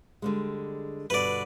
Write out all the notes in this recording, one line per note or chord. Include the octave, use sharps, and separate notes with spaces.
D3 G3 G#3
G2 B2 D3 B4 D5